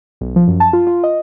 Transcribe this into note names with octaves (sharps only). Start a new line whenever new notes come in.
B1
F3
F#2
A5
F4
F4
D#5